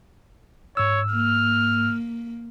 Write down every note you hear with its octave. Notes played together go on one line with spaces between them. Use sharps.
G#2 C#5 E6
A#3 F6